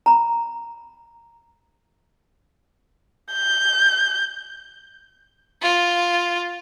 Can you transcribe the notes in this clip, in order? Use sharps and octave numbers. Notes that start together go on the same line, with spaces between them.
A#5 B5
G6
F4